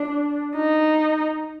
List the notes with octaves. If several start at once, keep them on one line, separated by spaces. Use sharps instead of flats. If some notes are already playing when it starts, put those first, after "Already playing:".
Already playing: D4
D#4